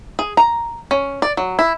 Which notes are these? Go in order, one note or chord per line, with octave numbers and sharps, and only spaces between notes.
G#4
A#5
C#4
D5
F#3
E4